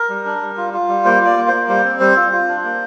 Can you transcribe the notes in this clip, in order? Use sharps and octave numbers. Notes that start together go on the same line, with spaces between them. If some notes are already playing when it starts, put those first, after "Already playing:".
Already playing: A#4
G3
D4
G3
F4
F4
G3
A#3 C5
F4 D5
A#3
C5
A#3
G3 C5
C4
G3 C5
F4
F4
D4
A#3